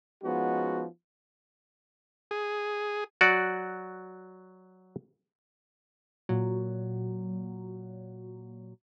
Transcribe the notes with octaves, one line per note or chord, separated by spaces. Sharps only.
F3 G#3 B3 C#4 D#4 F#4
G#4
F#3 F#4 D5
A#2 F#3